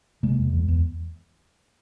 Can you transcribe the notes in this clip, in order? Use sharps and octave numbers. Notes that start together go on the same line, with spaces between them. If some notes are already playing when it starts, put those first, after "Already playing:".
C3 G#3 A#3
E2
E2
E2